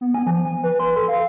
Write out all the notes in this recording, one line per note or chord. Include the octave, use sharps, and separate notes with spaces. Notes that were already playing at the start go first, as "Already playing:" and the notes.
B3
G#5
F3
G#5
B4
C6
A4
F5